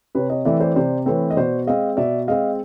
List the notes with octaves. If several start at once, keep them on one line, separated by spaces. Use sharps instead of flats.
C3 B4 C#5
C#5 D#5
E3 A3 C4 D5 E5
C5 D5
C3 C5 D5
E3 A3 C4 B4 C#5
D#5
B2 C5 D5
G#3 C4 D#5 F5
B2 D5 E5
G#3 C4 D#5 F5